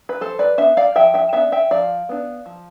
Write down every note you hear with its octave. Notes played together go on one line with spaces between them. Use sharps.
B4
F3 A4 C5
B4 D5
B3 D4 C5 E5
D5 F5
F3 E5 G5
E5 G5
B3 D4 E5 G5
E5 G5
F3 D5 F5
B3 D4
F3